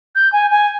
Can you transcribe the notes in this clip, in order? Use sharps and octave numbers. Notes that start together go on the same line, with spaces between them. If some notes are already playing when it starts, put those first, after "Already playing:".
G6
G#5
G#5